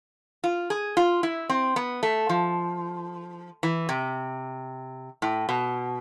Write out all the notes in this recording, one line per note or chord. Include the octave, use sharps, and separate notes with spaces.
F4
G#4
F4
E4
C4
B3
A3
F3
E3
C3
A2
B2